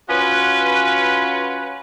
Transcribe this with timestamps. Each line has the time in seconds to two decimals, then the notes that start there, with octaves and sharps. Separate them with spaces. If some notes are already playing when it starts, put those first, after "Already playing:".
0.08 C#4 F4 F#4 B4